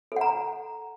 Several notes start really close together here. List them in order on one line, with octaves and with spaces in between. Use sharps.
A4 F#5 A#5